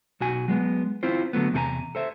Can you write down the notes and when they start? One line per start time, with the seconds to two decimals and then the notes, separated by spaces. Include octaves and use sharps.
0.20 B1 F#4 G#5
0.48 F#3 G#3 B3
1.03 C4 E4 F4 C5
1.33 D3 F#3 A3 B3
1.53 E2 C3 E4 A4 G#5 A#5
1.95 A4 C5 E5